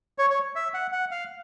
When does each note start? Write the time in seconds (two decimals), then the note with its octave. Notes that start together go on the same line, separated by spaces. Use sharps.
0.18 C#5
0.30 C#5
0.55 E5
0.74 F#5
0.92 F#5
1.11 F5